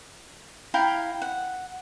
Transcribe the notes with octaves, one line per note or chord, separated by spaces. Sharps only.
E4 F5 G5 A#5
F#5